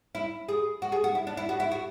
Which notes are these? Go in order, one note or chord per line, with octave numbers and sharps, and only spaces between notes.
E4
G#4
F#4
G#4
F#4
E4
D4
E4
F#4
E4
F#4